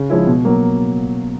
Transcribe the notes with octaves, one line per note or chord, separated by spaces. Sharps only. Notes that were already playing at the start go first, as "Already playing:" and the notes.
Already playing: C#3
F3 G#3 C#4 E4
B2
F#3 A#3